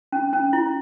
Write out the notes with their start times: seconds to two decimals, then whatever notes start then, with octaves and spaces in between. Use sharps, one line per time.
0.12 C#4
0.33 C#4
0.53 E4